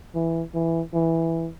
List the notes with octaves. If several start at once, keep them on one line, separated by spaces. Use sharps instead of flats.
E3
E3
E3